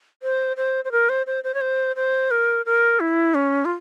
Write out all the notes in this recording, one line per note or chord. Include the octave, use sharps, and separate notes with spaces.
C5
C5
C5
A#4
C5
C5
C5
C#5
C5
C5
A#4
A#4
E4
C#4
F4